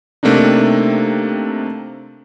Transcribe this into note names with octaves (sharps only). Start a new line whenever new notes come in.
C3 A3 A#3 C4 D4 D#4